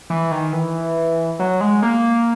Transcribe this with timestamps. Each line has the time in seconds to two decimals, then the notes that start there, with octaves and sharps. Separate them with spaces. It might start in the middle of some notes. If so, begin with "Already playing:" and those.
0.10 E3
0.31 D#3
0.52 E3
1.39 F#3
1.61 G#3
1.82 A#3